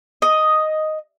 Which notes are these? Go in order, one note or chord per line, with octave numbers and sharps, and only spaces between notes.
D#5